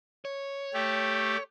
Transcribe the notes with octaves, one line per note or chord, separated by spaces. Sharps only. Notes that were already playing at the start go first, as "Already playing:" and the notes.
C#5
A3 G4